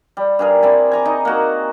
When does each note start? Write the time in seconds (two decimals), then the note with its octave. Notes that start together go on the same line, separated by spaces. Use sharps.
0.17 G3
0.39 G2 G#4 A#4
0.62 C4 E4 D5 G#5
0.92 G#5 A#5 D6
1.05 D#4 D#5
1.25 A#3 F#4